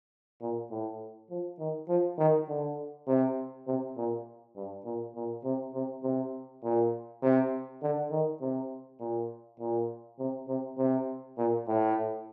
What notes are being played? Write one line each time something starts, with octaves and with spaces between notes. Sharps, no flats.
A#2
A2
F3
D#3
F3
D#3
D3
C3
C3
A#2
G2
A#2
A#2
C3
C3
C3
A#2
C3
D3
D#3
C3
A#2
A#2
C3
C3
C3
A#2
A2